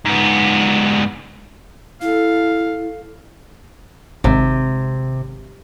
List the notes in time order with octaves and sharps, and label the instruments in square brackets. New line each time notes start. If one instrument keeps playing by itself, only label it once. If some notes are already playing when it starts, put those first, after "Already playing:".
[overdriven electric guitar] G#2 B3
[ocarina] E4 [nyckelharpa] A4 F5
[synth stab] G#1 [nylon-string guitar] C3